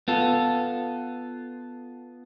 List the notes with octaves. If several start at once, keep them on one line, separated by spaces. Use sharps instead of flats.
B3 F4 A4